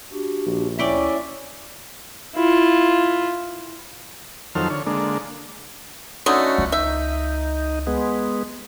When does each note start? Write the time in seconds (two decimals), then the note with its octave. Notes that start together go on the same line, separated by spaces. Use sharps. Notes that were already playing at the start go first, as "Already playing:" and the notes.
0.12 D4 F#4 G4
0.46 A#1
0.79 D2 C#4 E4 D5 E5 G5 B5 C#6
2.36 E4 F4
4.55 F2 D#3 F#3 A4 C5 F6
4.70 D3 C#5
4.86 D3 G#3 A#3 D4
6.26 D3 A3 C#4 D#4 F#4
6.58 C#2
6.72 D#4 E5
7.87 G#3 B3